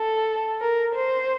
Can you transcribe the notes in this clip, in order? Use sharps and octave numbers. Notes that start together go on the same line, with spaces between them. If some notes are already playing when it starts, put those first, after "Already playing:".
Already playing: A4
A#4
C5